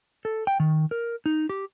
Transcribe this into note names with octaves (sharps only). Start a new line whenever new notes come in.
A4
G5
D#3
A#4
D#4
G4